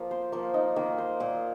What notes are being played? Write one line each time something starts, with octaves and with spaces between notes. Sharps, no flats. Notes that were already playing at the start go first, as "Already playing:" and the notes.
Already playing: F3 A#3
C5
F3 A#3
D#4
D#3 A#3
C5
A#2 A#3